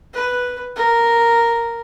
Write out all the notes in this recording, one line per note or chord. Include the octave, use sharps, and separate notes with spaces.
B4
A#4